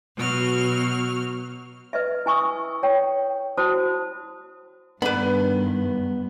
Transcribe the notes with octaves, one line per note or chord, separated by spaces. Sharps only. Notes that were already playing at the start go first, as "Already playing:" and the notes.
B2 F#3 F6
B4 D#5 E5
E4 G#5 C#6 D#6 E6
C#5 G5
E4 F#4 C5 A5 D#6
G2 D#3 B3 D4 B4 B5